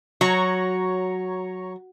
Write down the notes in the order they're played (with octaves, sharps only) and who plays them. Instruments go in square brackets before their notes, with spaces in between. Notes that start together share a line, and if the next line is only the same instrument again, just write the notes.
[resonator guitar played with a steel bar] F#3 [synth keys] C#5 A#5 C#6